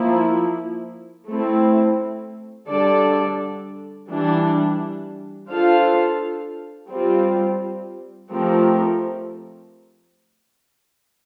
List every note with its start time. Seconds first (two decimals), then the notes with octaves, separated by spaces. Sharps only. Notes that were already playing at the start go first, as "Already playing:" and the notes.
Already playing: F3 A#3 E4
1.27 A3 C4 E4
2.68 D3 G3 D4 A4 D5
4.09 E3 G3 D4
5.49 D4 F4 A4 C5 F5
6.90 G3 C4 F4
8.30 F3 A3 C4 G4 A#4